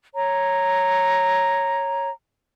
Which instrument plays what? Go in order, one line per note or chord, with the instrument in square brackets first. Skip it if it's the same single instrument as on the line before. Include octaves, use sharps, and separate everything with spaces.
[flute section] C#5 A#5